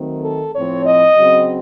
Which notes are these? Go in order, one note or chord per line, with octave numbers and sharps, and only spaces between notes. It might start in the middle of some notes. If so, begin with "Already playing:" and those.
Already playing: D#3 F#3 A3 C4
A4
A2 F3 C4 C#5
D#5
C#3 F#3 C4